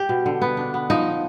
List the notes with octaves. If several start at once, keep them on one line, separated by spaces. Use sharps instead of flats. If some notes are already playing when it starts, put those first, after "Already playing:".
Already playing: G4
B2
D3
B3
D4
B3
F3 D#4